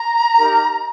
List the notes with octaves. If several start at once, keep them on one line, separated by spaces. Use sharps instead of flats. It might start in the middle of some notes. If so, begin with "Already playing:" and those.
Already playing: A#5
D#4 G4 A#4